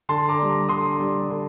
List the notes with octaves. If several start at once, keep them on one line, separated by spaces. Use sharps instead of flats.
D3 A5 C6
A#5 D6
G3 D4
A#5 D6
D3 C6 D#6
G3 D4
D3